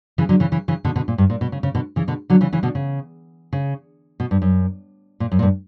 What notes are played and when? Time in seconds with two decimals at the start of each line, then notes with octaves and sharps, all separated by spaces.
0.18 C#3 E3
0.29 D3 F#3
0.40 C#3 E3
0.52 C#3 E3
0.68 C#3 E3
0.85 B2 D3
0.96 B2 D3
1.08 A#2
1.18 G2
1.30 A#2
1.41 B2
1.52 C#3
1.63 C#3
1.75 B2 D3
1.96 C#3 E3
2.08 B2 D3
2.30 D3 F#3
2.41 C#3 E3
2.53 C#3 E3
2.63 B2 D3
2.75 C#3
3.53 C#3
4.20 B2
4.31 G2
4.42 F#2
5.20 A#2
5.32 F#2
5.39 A#2
5.42 G2